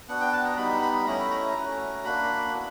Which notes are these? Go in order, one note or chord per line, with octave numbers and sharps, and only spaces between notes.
B3 D4 F#4 F#5
G5
A5
A#5
G3 B3 D#4 B5
B5
A3 C#4 E4 A#5
B5
A#5
A3 C#4 F#4
A#3 D4 F#4 B5
B3 E4